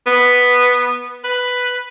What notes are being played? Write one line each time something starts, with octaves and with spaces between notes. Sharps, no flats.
B3
B4